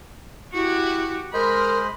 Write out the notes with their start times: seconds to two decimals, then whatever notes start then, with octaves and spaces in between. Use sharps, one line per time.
0.53 E4 F#4 G4
1.34 G#3 A#4 C5 D#5 B5